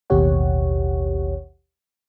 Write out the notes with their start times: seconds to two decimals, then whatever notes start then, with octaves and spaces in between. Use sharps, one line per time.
0.10 A1 D#2 B2 G4 C#5 F#5